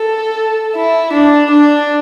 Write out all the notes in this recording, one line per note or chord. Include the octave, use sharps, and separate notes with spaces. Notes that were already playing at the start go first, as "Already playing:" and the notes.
Already playing: A4
E4
D4
D4